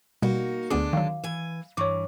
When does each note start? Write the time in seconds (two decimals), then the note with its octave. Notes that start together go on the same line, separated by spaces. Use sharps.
0.22 B2 G3 A#3 D#4 F#4
0.70 D2 D3 G#3 B3 D4 G#4 D6
0.93 D#3 F#3 F5
1.24 E3 G#5
1.77 G2 E3 C#5 C#6 D6